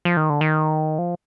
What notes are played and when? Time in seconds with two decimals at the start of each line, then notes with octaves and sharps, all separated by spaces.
0.05 F3
0.17 D#3
0.30 D3
0.41 D#3
0.99 F3